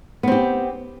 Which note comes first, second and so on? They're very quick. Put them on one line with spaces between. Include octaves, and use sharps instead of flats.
B3 C4 G4